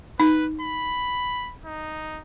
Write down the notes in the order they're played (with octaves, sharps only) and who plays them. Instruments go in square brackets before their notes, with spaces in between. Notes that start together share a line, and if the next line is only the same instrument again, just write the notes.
[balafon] D#4 [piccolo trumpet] B4
[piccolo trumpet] B5
D#4